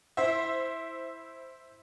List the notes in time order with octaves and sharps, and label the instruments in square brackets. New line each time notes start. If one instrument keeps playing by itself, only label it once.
[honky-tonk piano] E4 C5 E5